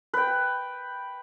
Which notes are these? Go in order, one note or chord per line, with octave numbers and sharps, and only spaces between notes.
B4 G5